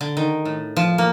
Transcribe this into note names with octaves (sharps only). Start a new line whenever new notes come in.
D3
D#3
A2
F3
A#3